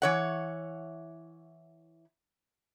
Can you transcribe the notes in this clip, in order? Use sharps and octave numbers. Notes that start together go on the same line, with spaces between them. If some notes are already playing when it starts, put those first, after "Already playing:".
E3 C#5 F#5